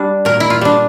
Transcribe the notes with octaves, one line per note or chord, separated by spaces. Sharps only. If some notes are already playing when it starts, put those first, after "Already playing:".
Already playing: G3 D4
A#2 A#4
E4
F4
G3 D4